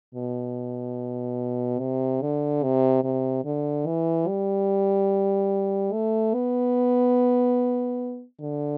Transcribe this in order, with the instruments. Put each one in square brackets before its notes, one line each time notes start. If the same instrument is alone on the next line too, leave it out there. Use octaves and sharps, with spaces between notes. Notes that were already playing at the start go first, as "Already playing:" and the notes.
[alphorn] B2
C3
D3
C3
C3
D3
E3
G3
A3
B3
D3